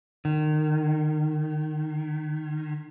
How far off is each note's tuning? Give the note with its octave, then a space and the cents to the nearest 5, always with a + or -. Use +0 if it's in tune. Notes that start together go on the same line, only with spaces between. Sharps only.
D#3 -25